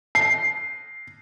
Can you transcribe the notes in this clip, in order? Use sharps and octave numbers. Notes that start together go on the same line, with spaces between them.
C7